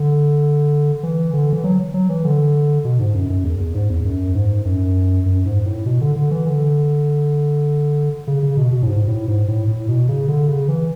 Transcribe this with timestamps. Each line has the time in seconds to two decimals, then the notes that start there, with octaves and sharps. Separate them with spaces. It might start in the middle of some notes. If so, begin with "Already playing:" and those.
Already playing: D3
1.03 E3
1.33 D3
1.53 E3
1.64 F#3
1.94 F#3
2.09 E3
2.24 D3
2.85 B2
2.99 G#2
3.14 F#2
3.30 F#2
3.44 E2
3.60 E2
3.75 G#2
3.90 E2
4.05 F#2
4.35 G#2
4.65 F#2
5.26 F#2
5.46 G#2
5.65 A2
5.86 B2
6.01 D3
6.16 D3
6.31 E3
6.46 D3
8.27 C#3
8.43 C#3
8.57 B2
8.72 B2
8.82 A2
8.87 G#2
9.08 A2
9.28 G#2
9.48 A2
9.68 A2
9.88 B2
10.09 C#3
10.28 D3
10.48 C#3
10.68 E3